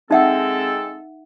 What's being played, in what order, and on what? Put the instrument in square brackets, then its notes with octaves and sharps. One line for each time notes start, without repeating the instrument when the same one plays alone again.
[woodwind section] G#3 C4 A4 [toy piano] D#4 E5 F#5